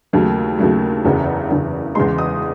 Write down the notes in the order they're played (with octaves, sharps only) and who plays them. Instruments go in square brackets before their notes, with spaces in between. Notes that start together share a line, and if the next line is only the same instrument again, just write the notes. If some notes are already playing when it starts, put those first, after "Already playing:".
[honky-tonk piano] D#2 C#3 F#3 A3
D#2 C#3 F#3 A3
F#1 E2 C#3
F#1 E2 C#3
E2 C#3 G#3 C6
D#6